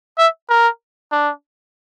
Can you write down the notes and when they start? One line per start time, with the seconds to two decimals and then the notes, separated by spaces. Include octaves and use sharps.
0.18 E5
0.49 A#4
1.12 D4